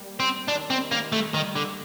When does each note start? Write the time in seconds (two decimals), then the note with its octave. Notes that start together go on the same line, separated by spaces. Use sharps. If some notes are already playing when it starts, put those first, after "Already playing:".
Already playing: G3 A#3
0.20 C4
0.48 D#3 G3 D4
0.70 C4
0.91 A#3
1.12 A3
1.33 D#3 G3 A#3
1.56 D3